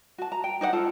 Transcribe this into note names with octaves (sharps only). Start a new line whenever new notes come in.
F#4 A5
A#5
G5
D#4 C5 C#5 F#5
F4 A4 A5